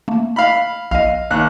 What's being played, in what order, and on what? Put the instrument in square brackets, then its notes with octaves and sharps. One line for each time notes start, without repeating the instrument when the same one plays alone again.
[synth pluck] A3 A#3
[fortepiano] F5 B5
[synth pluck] A#1 D#5 [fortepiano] F5
[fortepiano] D#2 F#6